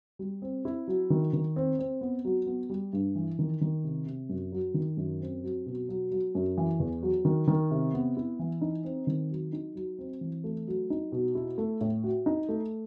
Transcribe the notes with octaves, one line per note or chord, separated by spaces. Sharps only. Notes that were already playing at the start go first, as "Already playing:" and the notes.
G3
C4
E4
F#3
D#3
D#3
C4
C4
B3
F#3
B3
G3
G2
E3
D#3
D#3
C3
C3
F#2
F#3
D#3
F#2
C4
F#3
B2
F#3
F#3
F#2
E3
E2
F#3
D#3
D#3
C3
B3
E4
E3
D#4
C4
D#3
F#3
D#4
F#3
C4
E3
A3
F#3
D#4
B2
E4
A3
A2
F#4
D#4
A3